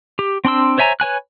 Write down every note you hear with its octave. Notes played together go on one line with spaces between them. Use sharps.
G4
C4 D4 C6 E6
C5 C#5 E5 G#5 A#5
B4 C#5 G#5 F#6